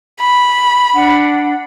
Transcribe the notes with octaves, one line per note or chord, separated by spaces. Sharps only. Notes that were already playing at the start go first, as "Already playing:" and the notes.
B5
D4 F#5